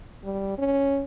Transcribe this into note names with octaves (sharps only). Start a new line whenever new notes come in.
G3
C#4